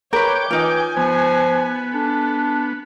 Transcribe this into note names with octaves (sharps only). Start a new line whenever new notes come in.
A#4 B4 C#5 G5 D6
E3 D#4 F4 G#5
F3 B3
D4 A4